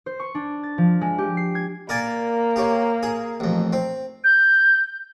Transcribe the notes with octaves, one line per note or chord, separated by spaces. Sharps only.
C5
C#6
D4
A6
F3
G#3
G4
C7
G#6
A#3 A#4 D5 G#5
G4 C#5
G#4
A1 F2
C4
G6